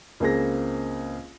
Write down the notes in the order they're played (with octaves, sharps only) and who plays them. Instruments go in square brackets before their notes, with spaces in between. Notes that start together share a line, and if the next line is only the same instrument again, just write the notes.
[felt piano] C#2 A#3 C4 G#4 A#6